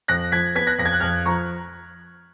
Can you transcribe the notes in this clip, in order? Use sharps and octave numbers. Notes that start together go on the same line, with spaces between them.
F2 F#6 A#6
F3 G#6 B6
B3 G#6 B6
F#6 A#6
F2 A#6
G#6
F#6
F2 F6 G#6
F3 A#5 C#6